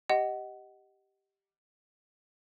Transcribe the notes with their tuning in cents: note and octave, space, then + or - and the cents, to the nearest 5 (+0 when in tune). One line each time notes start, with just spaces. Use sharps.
G4 +0 D#5 +0 F#5 +20